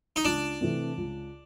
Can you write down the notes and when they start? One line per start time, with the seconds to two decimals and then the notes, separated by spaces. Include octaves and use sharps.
0.16 D#4
0.24 C#2 D4
0.61 C3 E3 A3 C4
0.97 C#2